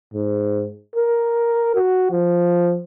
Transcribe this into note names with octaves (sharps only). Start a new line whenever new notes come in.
G#2
A#4
F#4
F3